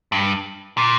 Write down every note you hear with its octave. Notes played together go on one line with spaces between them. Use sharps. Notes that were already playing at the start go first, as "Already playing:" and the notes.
G2
A#2